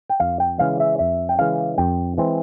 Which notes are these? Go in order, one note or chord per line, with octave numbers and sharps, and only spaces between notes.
G5
F2 F5
G5
C#3 E3 G#3 F5
E5
F2 E5
G5
C#3 E3 G#3 F5
F2 G5
E3 G#3 C4